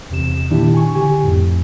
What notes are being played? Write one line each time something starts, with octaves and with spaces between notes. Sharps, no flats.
E2 C3 E7
A#2 D#3 D4 E4 G4
G#5 C#6
D3 G4 G#5
F2 A2